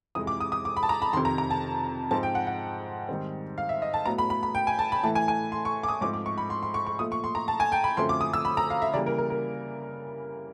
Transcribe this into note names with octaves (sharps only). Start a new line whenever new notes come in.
F2 C3 E3 G#3 D#6
D6
D#6
D#6
D6
B5
A5
A#5
B5
F2 C3 D#3 C6
A#5
A#5
A5
G#2 F3 G#3 C4 A5
G5
F#5
F#5
G#2 D#3 G3 C4
F5
E5
D#5
A5
A2 F#3 B3 A#5
B5
B5
B5
G5
G#5
A5
B5
A2 E3 A3 A5
G#5
G#5
C6
C#6
D6
D#6
G#2 F3 A3 C4 D6
D6
C#6
B5
C6
C6
C#6
C#6
A#2 F3 A3 D#6
C#6
C6
A#5
A5
G#5
G5
B5
F#2 D3 F3 A3 C4 C6
D6
D#6
E6
B5
A#5
F5
E5
C#3 E3 G3 A#3 D5
A#4
A#4
A#4